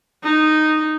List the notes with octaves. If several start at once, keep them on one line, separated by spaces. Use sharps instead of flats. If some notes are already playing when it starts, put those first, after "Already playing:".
D#4